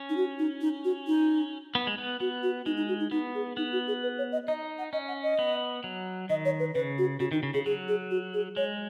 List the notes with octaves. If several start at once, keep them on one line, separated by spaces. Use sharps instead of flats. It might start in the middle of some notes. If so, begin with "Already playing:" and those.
Already playing: C#4
D#4
F#4
D#4
D#4
F#4
D#4
B3
G#3
B3
B3 F#4
F#4
G#3 D#4
D#4
F#4
D#4
B3 D#4
G#4
B3 D#4
F#4
G#4
B4
C#5
D#5
D#4 D#5
F#5
C#4 D#5
F#5
D#5
B3
F#3
D#3 D#5
C#5
B4
C#3 B4
F#4
C#3 F#4
D#3 D#4
C#3
C#3 G#4
F#3 G#4
G#4
F#4
G#4
G#3 C#5